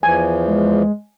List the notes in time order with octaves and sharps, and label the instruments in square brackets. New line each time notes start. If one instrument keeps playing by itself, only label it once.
[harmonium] E2 E3 F3 [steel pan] G#5
[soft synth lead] G#3